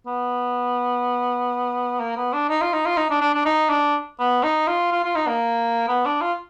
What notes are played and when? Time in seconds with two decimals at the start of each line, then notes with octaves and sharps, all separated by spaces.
0.07 B3
2.00 A#3
2.17 B3
2.33 D4
2.49 D#4
2.62 F4
2.74 D#4
2.86 F4
2.97 D#4
3.10 D4
3.21 D4
3.34 D4
3.46 D#4
3.70 D4
4.20 B3
4.44 D#4
4.68 F4
4.92 F4
5.04 F4
5.16 D#4
5.28 A#3
5.88 B3
6.05 D4
6.22 F4